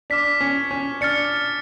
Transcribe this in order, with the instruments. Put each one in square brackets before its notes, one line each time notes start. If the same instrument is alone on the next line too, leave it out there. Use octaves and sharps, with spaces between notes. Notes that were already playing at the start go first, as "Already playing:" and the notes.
[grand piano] D4 [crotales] D6 F6 B6
[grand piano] C#4
C#4
[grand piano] D4 [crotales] F6 A6 C#7